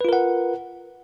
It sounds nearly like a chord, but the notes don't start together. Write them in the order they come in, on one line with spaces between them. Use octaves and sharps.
B4 F4 A#4 F#5